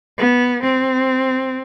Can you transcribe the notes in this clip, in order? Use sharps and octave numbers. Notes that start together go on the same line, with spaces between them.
B3
C4